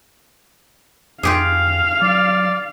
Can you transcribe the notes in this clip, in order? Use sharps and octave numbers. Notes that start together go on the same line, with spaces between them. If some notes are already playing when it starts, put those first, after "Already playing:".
F2 F4 G4 G#4 F5
F#3 D5